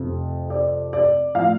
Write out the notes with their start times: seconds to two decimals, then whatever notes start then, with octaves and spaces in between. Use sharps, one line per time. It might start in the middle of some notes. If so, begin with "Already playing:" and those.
Already playing: F1 F2 C3
0.50 D5
0.93 D5
1.34 A2 F3 F5